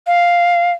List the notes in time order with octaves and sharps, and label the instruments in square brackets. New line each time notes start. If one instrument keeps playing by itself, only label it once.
[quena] F5